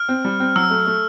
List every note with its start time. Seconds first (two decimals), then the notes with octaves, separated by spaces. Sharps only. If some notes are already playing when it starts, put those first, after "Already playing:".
Already playing: F6
0.09 C4
0.25 G3
0.40 C4
0.56 F#3 E6
0.70 A3
0.87 A3